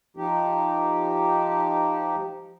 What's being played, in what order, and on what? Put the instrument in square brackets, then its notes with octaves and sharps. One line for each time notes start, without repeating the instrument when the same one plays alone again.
[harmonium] F3 D#4 G4